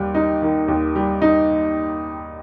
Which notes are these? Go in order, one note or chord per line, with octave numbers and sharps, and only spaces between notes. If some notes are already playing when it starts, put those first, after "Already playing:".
Already playing: D#2 G3
D#4
D#3
D#2
G3
D#4